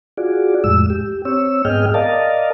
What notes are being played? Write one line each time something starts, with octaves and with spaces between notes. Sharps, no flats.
F4 F#4 G#4 D5
F2 A2 G#3 E6
G4
C4 C#5 E6
G#2 B3 G#4 D#5 G5 F6
A#4 D5 D#5 F5 A5